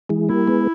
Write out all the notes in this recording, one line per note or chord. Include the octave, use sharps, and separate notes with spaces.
E3 G#3
G3 A#3 E4
G#3 B3